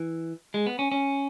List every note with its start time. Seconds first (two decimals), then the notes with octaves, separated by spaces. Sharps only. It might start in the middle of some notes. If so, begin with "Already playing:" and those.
Already playing: E3
0.54 G#3
0.66 B3
0.79 C#4
0.92 C#4